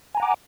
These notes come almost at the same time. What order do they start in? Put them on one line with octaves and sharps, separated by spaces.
G#5 A#5 F#5 D6